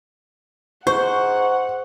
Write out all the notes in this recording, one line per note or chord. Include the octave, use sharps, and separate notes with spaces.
G#2 C5 F#5 C#6